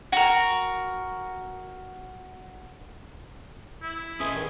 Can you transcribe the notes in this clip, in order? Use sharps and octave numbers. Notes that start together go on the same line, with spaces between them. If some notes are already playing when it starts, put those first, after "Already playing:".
F#4 A#4
E4
G#3 C#4 G#4 B4 C5 E5 D#6
G2 D#3